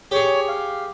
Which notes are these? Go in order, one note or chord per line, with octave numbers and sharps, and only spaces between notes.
G4 G#4 C#5
F5